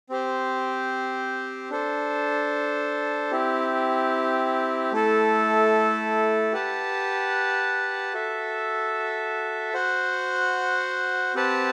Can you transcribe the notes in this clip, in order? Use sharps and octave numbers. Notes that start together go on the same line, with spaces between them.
C4 G4 C5
D4 A4 C5
C4 E4 G4
A3 E4 A4
G4 B4 F#5 A5
F#4 A4 E5
F#4 C5 F#5
C4 G4 B4 F#5 A5